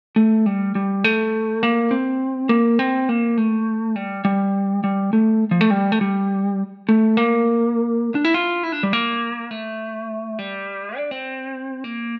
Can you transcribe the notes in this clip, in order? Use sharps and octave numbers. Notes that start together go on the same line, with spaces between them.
A3
G3
G3
A3
A#3
C4
A#3
C4
A#3
A3
G3
G3
G3
A3
F3
A3
G3
A3
G3
A3
A#3
D4
E4
F4
E4
D4
G3
A#3
A3
G3
D4
C4
A#3